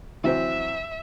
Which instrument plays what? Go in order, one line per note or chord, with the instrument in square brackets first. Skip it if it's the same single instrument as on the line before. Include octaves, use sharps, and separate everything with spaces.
[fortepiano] E3 F#3 C4 [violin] E5